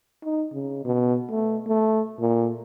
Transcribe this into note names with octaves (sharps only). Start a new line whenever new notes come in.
D#4
C#3
B2
A3
A3
A#2